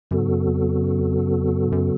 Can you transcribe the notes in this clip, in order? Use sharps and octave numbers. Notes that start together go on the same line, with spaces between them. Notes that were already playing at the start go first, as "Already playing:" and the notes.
F#2 C#3 F#3 B3 F#4 A4
G#2
F#2
F2
F#2
F2
F#2
F2
F#2
G#2
F#2